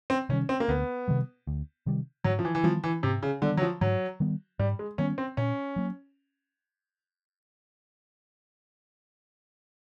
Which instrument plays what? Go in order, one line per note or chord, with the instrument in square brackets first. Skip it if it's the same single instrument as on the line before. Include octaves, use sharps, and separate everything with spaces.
[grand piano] C4
[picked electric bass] C3 D#3 G3 [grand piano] C#4
[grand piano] C4
A#3
[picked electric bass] D2 [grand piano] B3
[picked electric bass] C3 D#3 G3
D2
C3 D#3 G3
[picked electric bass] G#2 [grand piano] F#3
[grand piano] F3
E3
E3
[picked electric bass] D#3 G3 B3 [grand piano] F3
[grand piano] E3
[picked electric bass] G#2 [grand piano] C3
[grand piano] C#3
[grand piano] D3 [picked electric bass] D#3 G3 B3
[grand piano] F#3
F3
[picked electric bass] G#2 [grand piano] F#3
[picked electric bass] D#3 G3 B3
[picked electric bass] G#2 [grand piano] G3
[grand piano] G#3
[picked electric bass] D#3 G3 B3 [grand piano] C#4
[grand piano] C4
[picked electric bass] A#2 [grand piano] C#4
[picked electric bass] F#3 A#3